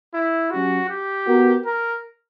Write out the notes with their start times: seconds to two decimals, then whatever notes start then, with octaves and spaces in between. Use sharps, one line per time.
0.14 E4
0.51 F#3 C#4 F#4 G4
0.89 G4
1.27 B3 F#4 A#4
1.65 A#4